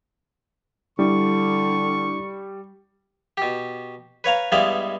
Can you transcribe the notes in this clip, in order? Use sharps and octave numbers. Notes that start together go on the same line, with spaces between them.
D3 G3 D4 E4 C#6
B2 G4
B4 C#5 F5 A#5
G2 G3 G#3 B3 E4 F5